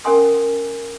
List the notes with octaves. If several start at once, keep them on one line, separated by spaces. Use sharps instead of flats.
C#4 A#4 F#5 G#5 C6 D#6